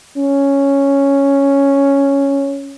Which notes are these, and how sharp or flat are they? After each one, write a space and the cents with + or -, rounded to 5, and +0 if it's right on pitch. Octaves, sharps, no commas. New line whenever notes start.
C#4 +0